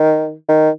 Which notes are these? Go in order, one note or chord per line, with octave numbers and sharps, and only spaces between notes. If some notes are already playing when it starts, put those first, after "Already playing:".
Already playing: D#3
D#3